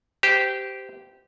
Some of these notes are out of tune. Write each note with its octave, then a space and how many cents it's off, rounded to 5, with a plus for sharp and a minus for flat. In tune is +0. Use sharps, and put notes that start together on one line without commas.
G4 -10 C5 -25